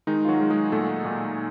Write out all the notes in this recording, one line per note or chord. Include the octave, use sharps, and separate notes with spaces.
D#3 G#3 D#4
F4
F#3 F#4
G#3
G#3 G#4
A#2 A3 A4
A#2